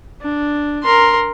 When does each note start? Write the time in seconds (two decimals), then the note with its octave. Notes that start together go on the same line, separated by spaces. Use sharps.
0.22 D4
0.83 A#4 C6